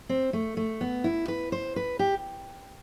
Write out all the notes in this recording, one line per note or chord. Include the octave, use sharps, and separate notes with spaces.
C4
A3
A3
B3
E4
B4
C5
B4
G4